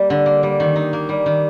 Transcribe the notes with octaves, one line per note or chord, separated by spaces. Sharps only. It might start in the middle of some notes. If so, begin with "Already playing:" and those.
Already playing: G3 A#3
D3
A#3
G3
D#3
D#4
A#3
G3
D#3